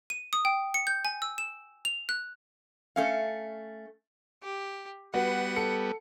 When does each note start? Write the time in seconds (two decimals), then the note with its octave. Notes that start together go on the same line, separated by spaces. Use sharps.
0.10 D#7
0.33 D#6
0.45 G5
0.74 C#7
0.87 G6
1.05 G#5
1.22 E6
1.38 E7
1.85 F7
2.09 F#6
2.96 A3 C#4 F5
4.43 G4
5.14 G3 B3 F#4 B4 F#5
5.56 A4 C#7